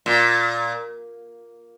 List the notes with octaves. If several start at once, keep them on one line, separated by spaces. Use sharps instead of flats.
A#2